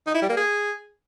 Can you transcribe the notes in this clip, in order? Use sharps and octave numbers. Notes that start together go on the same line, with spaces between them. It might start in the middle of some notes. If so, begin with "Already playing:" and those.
D#4
E4
G3
A#3
G#4